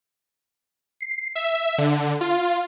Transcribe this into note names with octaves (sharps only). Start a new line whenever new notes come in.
C7
E5
D3
F4